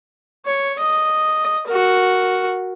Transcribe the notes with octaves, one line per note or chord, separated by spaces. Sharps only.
C#5
D#5
F#4 A#4